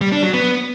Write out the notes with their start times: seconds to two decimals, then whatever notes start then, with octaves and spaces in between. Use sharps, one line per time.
0.01 G3
0.12 D4
0.23 F#3
0.33 B3